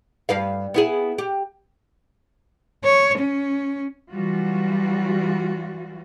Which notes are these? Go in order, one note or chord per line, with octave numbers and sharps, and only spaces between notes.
G2 B4 F5
B3 E4 G#4
G4
C#5
C#4
E3 F#3 G3 F4 F#4